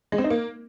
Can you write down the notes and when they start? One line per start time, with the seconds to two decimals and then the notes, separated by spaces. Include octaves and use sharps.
0.12 G#3
0.18 C4
0.24 D#4
0.30 A#3